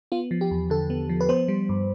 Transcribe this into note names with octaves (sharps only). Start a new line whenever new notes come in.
B3 F4
F3
G4
E2
D3 A4
B3
F3
B4
B3 C5
G3
G2